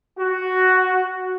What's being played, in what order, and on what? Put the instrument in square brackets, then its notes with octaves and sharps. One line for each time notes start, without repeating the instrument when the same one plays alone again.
[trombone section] F#4